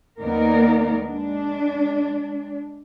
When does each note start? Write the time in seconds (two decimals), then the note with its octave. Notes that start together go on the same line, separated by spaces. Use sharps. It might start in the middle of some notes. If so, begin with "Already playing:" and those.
0.21 D#2 A#3 B3 D#4 A#4 D5
1.02 G#3 D4